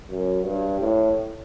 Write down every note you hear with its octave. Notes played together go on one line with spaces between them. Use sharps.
F#2
G2
A2